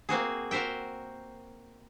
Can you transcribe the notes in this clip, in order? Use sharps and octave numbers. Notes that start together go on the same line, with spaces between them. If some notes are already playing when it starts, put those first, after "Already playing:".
A#3 C4 F#4 G#4
F#4 A#4 C5 E5 G5